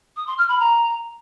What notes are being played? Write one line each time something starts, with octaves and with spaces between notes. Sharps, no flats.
D#6
C6
F6
B5
A#5